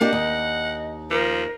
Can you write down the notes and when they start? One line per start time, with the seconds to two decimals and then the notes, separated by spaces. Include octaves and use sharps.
0.01 A#3 D4 G4 D#5 F#5
0.13 D#2
1.11 F3 A#4